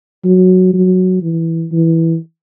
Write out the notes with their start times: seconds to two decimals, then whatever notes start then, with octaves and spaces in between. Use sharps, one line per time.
0.24 F#3
0.73 F#3
1.22 E3
1.72 E3